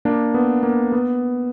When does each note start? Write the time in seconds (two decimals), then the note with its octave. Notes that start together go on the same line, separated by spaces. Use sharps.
0.05 A#3 D4
0.34 B3
0.63 A#3
0.92 B3